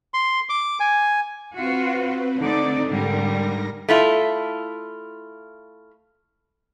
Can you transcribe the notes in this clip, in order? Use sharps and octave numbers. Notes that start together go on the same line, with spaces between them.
C6
D6
G#5
C4 F4 F#4 B4
D3 A3 C4 D#4 D5
G#2 D3 G3 A#4 A#6
A3 E4 F4